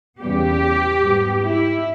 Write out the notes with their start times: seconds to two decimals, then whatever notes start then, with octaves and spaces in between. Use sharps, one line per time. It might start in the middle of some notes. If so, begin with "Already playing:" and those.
0.21 E2 C#3 G3 B3 G4
1.01 G#2 G3 B3
1.41 E4